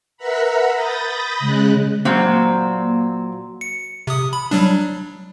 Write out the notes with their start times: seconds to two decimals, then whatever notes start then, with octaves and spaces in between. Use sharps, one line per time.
0.17 A#4 B4 E5 F#5 A#5 B5
0.75 B5 D#6 G6 A6 A#6
1.40 C#3 G#3 F#6
2.05 A#2 F#3 A#3 C4
3.61 C#7
4.07 C3 D#6
4.33 B5
4.51 F#3 G3 D4